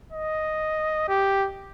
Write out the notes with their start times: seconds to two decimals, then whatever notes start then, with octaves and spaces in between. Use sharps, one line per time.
0.13 D#5
1.09 G4